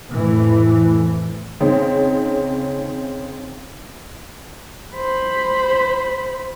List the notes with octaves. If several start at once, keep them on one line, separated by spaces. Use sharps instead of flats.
F2 A2 E3 A3
C#3 C4 C#4 D#4
C5 B5